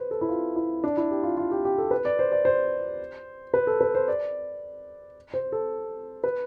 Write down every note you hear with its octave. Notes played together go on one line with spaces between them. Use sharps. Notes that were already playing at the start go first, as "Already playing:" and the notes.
Already playing: B4 C5
A4
E4
F4
E4
D4
E4
G4
F4
F4
G4
G4
A4
B4
D5
C5
D5
C5
B4
A4
B4
C5
D5
C5
A4
B4